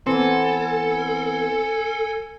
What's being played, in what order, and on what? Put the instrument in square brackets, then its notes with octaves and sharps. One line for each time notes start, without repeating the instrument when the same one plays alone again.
[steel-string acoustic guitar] E3 B3 [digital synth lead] C4 [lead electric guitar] A4 [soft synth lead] G#5